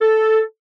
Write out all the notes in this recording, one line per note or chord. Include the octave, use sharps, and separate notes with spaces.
A4